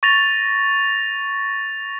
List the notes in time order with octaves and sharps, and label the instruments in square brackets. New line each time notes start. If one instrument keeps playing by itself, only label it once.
[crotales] C#6 A6 A#6 F7